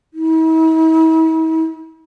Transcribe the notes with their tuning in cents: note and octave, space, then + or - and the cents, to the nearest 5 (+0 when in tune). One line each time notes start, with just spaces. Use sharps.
E4 -45